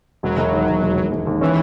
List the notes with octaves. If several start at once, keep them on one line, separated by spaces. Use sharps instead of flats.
E1 F#3
E1
D#2
E1
E1
E1
E1
D#2
E3 C#4